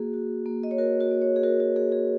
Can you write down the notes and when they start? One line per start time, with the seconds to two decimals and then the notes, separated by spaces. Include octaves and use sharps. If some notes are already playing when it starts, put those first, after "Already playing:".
Already playing: A#3 F#4 G#4
0.13 F#4
0.46 A#3
0.63 D#5
0.71 C#5
0.78 F#4 A#4
1.00 F#4 A#4
1.11 A#3
1.22 G#4 C#5
1.36 G#4
1.43 F#4 A#4
1.60 F#4
1.76 A#3 G#4
1.92 G#4